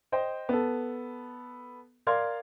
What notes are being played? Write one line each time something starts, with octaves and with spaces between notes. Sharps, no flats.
C5 D#5 G5
B3 A4
A#4 D5 F5 C6 G#6